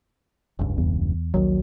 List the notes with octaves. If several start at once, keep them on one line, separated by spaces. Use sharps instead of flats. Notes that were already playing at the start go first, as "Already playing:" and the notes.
F1 C#2 G2
E2
A#1 D#2 D#3 F#3